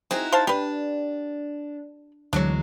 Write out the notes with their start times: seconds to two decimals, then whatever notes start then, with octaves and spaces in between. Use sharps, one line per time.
0.11 C4 D#4 E4 F#4 G#4
0.32 C5 F5 A5
0.47 D4 G4 B4
2.33 D2 E3 F#3 G#3 D4 C#5